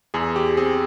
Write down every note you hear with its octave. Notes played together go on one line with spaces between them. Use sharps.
E2 G#4
G4
C4 G#4